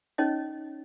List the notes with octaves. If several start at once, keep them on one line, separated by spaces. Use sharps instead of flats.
C#4 D#4 C#5 D#5